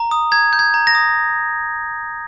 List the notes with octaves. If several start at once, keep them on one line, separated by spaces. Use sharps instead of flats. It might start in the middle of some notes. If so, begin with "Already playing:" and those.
Already playing: A#5
D#6
A#5 G#6
G6
G#6
A#5
A#6
D#6